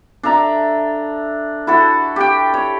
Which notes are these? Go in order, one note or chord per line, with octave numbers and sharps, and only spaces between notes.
D4 A4 E5 A#5
E4 F#4 A4
G4 G5
C#5